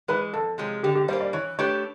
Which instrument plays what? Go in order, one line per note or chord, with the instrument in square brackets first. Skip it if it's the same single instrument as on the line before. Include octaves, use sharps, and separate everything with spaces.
[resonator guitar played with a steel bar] E3 G#3 [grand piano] B4
[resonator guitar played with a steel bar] F2 [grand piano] A4
[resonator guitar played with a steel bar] C3 F3 G#3 C#4
[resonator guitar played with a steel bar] D3 [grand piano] G4
[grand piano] G4
[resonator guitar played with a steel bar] G3 A#3 C#4 [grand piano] C5
[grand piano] D5
[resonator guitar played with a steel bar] E3 [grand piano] C#5
[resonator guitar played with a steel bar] A3 D4 G4 B4 [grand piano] C#5